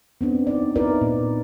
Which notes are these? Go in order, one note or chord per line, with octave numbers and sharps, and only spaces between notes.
B3 C4 D4
D#4 D5
D#4 E4 A#4 B4 D5
A#2